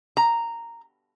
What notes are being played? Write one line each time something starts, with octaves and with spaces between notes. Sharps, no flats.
A#5